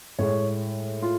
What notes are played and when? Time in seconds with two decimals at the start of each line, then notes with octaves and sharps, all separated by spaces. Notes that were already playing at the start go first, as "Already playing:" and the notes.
0.19 A2 G#3 C#5
1.03 F4